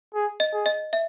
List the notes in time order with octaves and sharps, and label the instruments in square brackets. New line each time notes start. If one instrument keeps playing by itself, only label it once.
[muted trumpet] G#4
[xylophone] D#5
[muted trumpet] G#4
[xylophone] D#5
E5